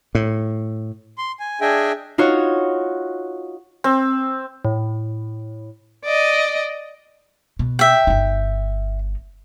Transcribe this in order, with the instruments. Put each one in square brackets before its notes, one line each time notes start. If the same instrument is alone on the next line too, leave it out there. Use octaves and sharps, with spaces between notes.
[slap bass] A2
[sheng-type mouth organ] C6
G#5
D4 G#4 D#5 E5 G5 G#5
[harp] D#4 F4 F#4 C#5
[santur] C4
[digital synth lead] A2
[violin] D5 D#5
[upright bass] B2
[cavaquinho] E5 G5
[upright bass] G1 D#4